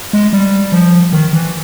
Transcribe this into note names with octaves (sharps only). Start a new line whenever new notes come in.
G#3
G3
F3
D#3
E3